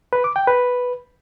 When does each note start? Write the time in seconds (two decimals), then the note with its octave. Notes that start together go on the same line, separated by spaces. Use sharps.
0.13 B4
0.24 D6
0.36 G5
0.47 B4